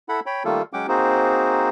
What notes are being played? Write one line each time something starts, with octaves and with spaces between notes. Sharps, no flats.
E4 A4 F#5 B5
C#5 G5 B5
D#3 G3 A3 A#3 F4 A4
F#3 G#3 C#4 F#5 G5 D6
A#3 C4 D#4 F#4 G#4 C5